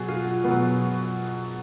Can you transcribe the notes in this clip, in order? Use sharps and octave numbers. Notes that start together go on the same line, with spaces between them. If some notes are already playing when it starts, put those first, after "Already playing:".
Already playing: B2 F#3 F#4 G#4
F4
B2 F#3 B3